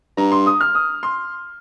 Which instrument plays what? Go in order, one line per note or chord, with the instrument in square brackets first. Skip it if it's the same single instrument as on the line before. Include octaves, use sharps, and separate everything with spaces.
[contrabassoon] G2 [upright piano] A#5
[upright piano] C6
D#6
F6
D#6
C6